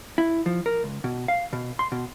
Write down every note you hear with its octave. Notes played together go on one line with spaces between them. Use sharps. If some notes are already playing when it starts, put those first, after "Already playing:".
E4
F3
A#4
C#2
B2
F5
B2
C6
B2